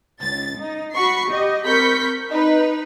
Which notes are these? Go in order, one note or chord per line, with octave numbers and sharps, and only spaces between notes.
C#2 A6
D#4
F#4 B5 C#6 C7
G4 D#5
C4 A#4 B5 C#6 G6 B6
D#4 B4